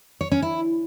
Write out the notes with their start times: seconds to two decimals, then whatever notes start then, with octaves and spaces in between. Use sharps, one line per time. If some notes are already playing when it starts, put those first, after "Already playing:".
0.21 C#5
0.32 C#4
0.42 E4